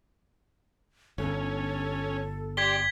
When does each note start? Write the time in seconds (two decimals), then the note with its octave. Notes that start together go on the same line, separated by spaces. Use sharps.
1.18 G1 C#4 A4
2.57 G4 D5 C6 G#6 B6 G7